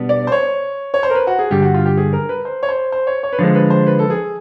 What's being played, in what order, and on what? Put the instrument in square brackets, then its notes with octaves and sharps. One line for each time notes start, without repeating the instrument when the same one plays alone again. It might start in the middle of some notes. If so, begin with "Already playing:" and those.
Already playing: [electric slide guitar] B2 G3 B3 D4
[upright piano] D5
C5
C#5
C#5
C5
A#4
B4
F#4
G#4
[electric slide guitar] G2 D3 G3 [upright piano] G4
[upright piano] F#4
F4
G4
G#4
A#4
B4
C5
C#5
C5
C5
C#5
C#5
B4
[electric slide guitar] D3 F3 G#3 [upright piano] C5
[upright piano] B4
C5
B4
A4
G#4